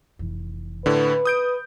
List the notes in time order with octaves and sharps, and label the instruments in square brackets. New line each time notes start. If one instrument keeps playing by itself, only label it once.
[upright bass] F1 E3
[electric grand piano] A2 D3 [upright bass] C#4 [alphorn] B4
[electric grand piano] D#6 G6 D7